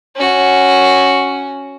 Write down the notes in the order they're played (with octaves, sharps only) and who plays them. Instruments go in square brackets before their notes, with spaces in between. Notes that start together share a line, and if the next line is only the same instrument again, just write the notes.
[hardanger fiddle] C#4 F#4